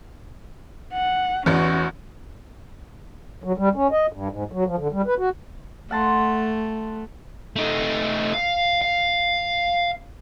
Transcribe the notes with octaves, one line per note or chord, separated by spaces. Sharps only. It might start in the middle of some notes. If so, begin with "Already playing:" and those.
F#5
A1 E2 C#4 F#4
F#3
G3
C#4
D#5
G2
G#2
F#3
F3
D3
G3
B4
F#4
A3 F#5 A5 C6
A3 D#4
F5
F5